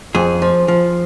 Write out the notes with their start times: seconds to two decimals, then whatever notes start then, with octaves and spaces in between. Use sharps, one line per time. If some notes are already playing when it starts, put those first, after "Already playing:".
0.15 F2 G#4
0.42 F3
0.68 F3